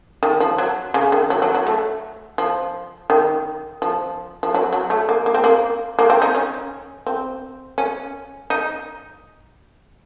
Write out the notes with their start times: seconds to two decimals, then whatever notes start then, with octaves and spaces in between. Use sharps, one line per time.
0.23 D#3
0.40 F3
0.58 F#3
0.94 C#3
1.12 D#3
1.30 F#3
1.42 F#3
1.54 F#3
1.67 A3
2.38 F3
3.10 D#3
3.82 F3
4.43 F3
4.55 F#3
4.73 F#3
4.90 A3
5.09 A#3
5.26 A#3
5.34 C4
5.44 A#3
5.99 A#3
6.10 C4
6.22 D#4
6.35 C#4
7.07 C4
7.78 C#4
8.50 D#4